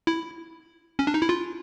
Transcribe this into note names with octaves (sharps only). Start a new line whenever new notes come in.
E4
C#4
D4
D#4
E4
F4